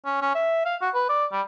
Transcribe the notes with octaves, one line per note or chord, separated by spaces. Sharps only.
C#4
C#4
E5
F5
F#4
B4
D5
G3